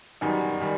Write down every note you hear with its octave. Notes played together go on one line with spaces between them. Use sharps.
F#2 D#3 G3 B3 D#4 G#5
D#3 G3